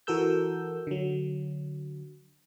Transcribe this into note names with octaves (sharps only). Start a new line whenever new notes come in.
E3 F#4 A4 A#4 E6 G6
D3 F#3